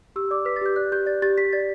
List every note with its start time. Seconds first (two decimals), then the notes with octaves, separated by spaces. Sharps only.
0.16 G4 E6
0.31 D5 D6
0.45 B4 B6
0.56 A6
0.61 G4 G6
0.76 D5 F#6
0.92 G4 G6
1.06 D5 A6
1.22 G4 A6
1.38 G4 B6
1.53 D5 A6